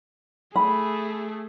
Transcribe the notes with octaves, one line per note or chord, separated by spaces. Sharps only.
A3 G#4 B5